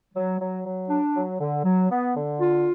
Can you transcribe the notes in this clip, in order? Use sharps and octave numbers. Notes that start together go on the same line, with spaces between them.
F#3
F#3
F#3
D4
F#3
D3
F#3
B3
D3
F4